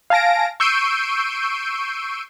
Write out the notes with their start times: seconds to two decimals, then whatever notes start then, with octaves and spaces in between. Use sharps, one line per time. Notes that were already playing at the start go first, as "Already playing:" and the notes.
0.10 F5 G#5 A5 A#6 D7
0.60 C#6 E6 G6 C7 D7 D#7